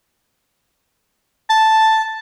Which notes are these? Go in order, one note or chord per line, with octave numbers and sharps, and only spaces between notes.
A5